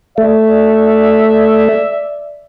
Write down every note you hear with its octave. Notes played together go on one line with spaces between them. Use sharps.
A3 D5 E5